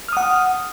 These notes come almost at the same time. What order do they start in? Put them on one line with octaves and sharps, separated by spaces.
F6 D#6 F#5